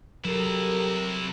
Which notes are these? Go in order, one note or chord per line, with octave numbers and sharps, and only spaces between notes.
C3 F#3 E4 G4 A4 A#4